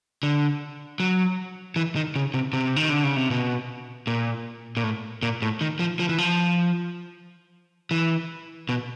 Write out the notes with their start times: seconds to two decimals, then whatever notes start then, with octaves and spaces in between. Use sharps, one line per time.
0.23 D3
1.00 F#3
1.76 E3
1.96 D#3
2.16 C#3
2.34 C3
2.53 C3
2.76 D#3
2.90 D3
3.04 C#3
3.16 C3
3.31 B2
4.07 A#2
4.77 A#2
4.84 A2
5.23 A#2
5.42 A2
5.61 D#3
5.79 F3
5.99 F3
6.09 E3
6.18 F3
7.91 E3
8.69 B2